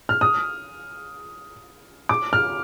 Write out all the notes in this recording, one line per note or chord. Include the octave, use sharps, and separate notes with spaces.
F6
D#6
D6
F6